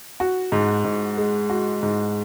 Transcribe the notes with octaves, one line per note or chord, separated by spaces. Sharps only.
F#4
G#2
G#2
G#3
F#4
G#2